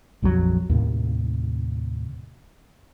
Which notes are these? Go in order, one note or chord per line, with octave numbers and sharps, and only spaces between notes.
A#1 F2 E3 F#3
D#2 A2 C3